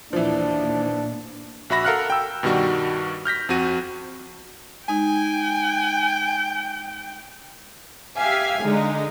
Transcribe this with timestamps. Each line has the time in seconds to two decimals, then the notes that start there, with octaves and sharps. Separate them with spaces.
0.13 D#2 A#2 E3 F3 D4
1.70 A#1 F#4 E5 B5 A#6
1.85 A4 A#4 F5 F#5 F6 F#6
2.10 G5 E6
2.43 G2 B2 D#3 G3 F#4
3.25 F6 G6 A#6 B6
3.49 F2 C4 F#4 D#7
4.88 G#3 D#4 G5 G#5
8.18 G4 E5 F5 G#5
8.62 D3 G#3 D#4